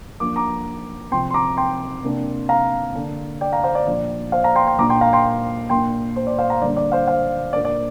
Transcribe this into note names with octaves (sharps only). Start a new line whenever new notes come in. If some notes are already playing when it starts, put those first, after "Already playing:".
F3 A#3 D4 D6
A#5 D6
C3 F3 C4 G5 C6
C6
A#5 D6
G5 C6
C3 A#3 D4
F5 A#5
D3 A#3 D4
D5 G5
F5 A#5
C5 F5
D5
A#2 F3 D4 D5
C5 F5
F5 A#5
G5 C6
G5 C6
A#2 A#3 D4 A#5 D6
G5 C6
F5 A#5
G5 C6
A#2 A#3 D4 G5 C6
C5
D5
C5 F5
F5 A#5
D3 G3 A#3 D4 D5
D5
C5 F5
C5 F5
A#2 A#3 D4 D5
D5